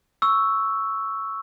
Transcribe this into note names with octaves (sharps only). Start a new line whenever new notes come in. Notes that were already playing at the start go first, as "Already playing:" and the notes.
C#6 E6